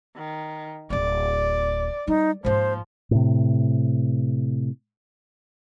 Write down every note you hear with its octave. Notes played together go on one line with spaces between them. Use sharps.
D#3
D1 C4 D5
G3 D#4
G#2 F3 A#3 C5
A2 C3